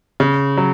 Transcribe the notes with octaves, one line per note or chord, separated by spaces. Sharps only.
C#3
F#3